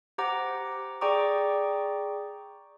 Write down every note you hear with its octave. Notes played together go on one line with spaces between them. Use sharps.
G4 C5 F#5 A#5 D6
G#4 D5 G5 A#5 C#6 D6